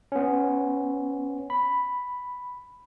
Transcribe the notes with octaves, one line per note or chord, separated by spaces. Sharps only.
B3 C#4
B5